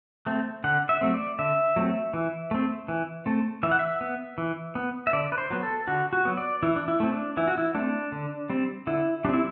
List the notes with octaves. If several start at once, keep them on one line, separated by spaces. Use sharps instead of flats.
A3 C4
D3 F#5
E5
F#3 A3 C4
D5
D3 E5
F#3 A3 C4
E3
A3 C4
E3
A3 C4
E3 E5
F#5
E5
B3
E3
B3
E5
D3 D5
B4
C5
F#3 B3
A4
D3 F#4
F#4
F#3 B3
D5
E3 E4
D4
E4
A3 C4
D4
E3 E4
F#4
E4
A3 C4 D4
D3
G3 C4
D3 E4
G3 C4 D4 E4